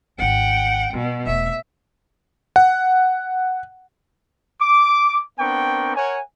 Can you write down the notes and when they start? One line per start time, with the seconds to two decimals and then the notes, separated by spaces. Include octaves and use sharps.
0.19 G#1 D4 F#5 G5
0.94 B2 G3
1.26 E1 A3 E5
2.56 F#5
4.60 D6
5.39 B3 C4 D4 A#4 G5 C#6
5.95 A#4 C#5 F#5 G#5